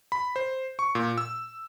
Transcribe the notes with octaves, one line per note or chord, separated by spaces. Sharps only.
B5
C5
C#6
A#2
E6